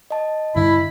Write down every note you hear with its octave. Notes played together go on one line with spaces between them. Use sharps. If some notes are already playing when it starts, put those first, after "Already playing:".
D#5 A5
G2 D3 E4 B5